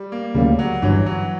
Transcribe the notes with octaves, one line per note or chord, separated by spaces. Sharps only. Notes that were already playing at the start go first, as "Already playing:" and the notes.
Already playing: G3
A#3
D2 C#3 F#3 G3 A#3
F#3
G1 G2 E3 F#3
F#3